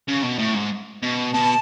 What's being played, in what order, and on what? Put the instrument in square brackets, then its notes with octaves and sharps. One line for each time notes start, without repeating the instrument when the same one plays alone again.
[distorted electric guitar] C#3
B2
A2
G#2
B2
[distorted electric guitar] B2 [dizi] A5